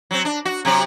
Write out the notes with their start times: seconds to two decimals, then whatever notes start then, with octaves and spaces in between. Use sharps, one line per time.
0.11 F#3 C4
0.25 D4
0.45 F#4
0.65 C3 F#3 G4